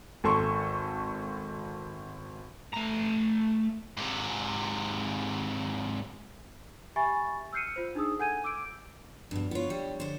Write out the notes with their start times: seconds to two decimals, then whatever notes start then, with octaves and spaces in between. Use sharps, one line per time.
0.24 G#1 A4 C6 C#6
2.74 A3 A#5
3.97 G#2 C3
6.96 G4 E5 G#5 B5 C#6 A6
7.53 E6 F6 G6 C7 C#7 D#7
7.76 F4 C5
7.95 D4 D#4 G#4 D#6 E6
8.19 A4 F#5 G#5 G6 G#6 D#7
8.44 D6 E6 G6 D7
9.31 G2 B2 F3 D4
9.51 B3 E4 F4 C#5
9.70 G3
10.00 D3 F3 C5